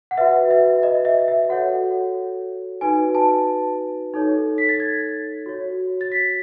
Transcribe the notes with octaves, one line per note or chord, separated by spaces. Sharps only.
F#5
F#4 B4 E5
E5
D#5
E5
E5
F#4 A4 C#5 F#5
D#4 F#4 B4 G#5
A5
D#4 A4 C#5
B6
A6
G#6
F#4 C#5
A6
B6